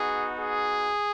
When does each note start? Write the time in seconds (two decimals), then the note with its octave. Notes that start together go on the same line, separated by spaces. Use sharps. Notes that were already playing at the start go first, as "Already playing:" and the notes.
Already playing: B3 D#4 F#4 G#4
0.38 G#4